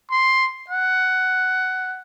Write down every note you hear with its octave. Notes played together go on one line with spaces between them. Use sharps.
C6
F#5